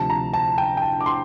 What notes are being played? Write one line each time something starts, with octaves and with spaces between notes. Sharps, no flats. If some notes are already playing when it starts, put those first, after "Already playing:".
Already playing: D2 C3 F3 A5
A#5
A5
G5
G5
A5
D6
C6